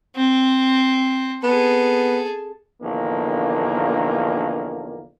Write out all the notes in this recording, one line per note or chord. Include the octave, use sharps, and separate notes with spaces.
C4
B3 G#4 A4
A#1 E2 D3 D#3 A#3